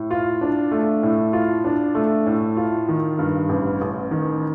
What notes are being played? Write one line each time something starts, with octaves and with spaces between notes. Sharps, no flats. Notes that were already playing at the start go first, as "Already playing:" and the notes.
Already playing: A2
F4
D4
A3
A2
F4
D4
A3
A2
F4
D#3
G2
A1
A1
D#3